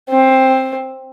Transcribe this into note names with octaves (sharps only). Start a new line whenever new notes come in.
C4